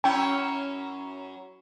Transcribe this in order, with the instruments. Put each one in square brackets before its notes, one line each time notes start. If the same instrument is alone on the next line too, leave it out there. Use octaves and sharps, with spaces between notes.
[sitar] F#2 C#4 E4 [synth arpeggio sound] G5